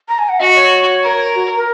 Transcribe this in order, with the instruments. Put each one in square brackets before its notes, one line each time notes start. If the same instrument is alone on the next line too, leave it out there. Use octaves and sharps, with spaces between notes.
[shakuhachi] A#5
G#5
F#5
[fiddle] F#4 [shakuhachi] D#5
[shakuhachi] C#5
[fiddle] A#4
[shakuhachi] F#4
A#4